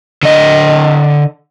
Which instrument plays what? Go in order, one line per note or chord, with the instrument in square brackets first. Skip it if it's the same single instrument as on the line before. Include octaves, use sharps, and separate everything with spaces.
[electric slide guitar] D3 D#5